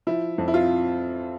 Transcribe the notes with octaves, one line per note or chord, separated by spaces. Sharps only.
F3 E4
F2
E4
F4